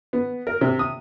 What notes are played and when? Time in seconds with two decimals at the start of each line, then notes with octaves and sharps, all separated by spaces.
0.13 B3
0.47 A#4
0.61 C3
0.79 D#6